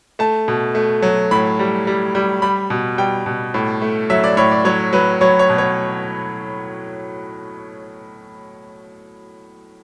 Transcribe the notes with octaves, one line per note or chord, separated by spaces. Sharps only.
A3 A5
B2
A3
F#3
A2 B5
G3
G3
G3
G3 B5
B2
G3 G5
B2
A2
A3
F#3 E5
D5
A2 C#5
D5
F#3 C#5
F#3 B4
F#3 C#5
C#5
B2
C#5